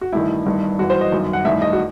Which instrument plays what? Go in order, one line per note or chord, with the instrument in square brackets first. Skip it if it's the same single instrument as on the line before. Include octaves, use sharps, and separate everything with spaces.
[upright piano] F#4
A1 G2 D#3 E4
G1 G2 D#3
G1 F#2 E3 F#4
C5
D#5
G1 F#2 D#3
F#5
A1 G2 D#3 E5
D#5
F#4